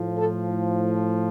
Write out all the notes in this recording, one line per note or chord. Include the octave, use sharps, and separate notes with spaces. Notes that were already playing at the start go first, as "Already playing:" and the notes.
Already playing: A2 F3
A4